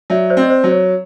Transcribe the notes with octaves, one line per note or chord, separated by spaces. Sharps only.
F#3 D5 E5
C5 D5
C4 D#5
C5 D5
F#3
C#5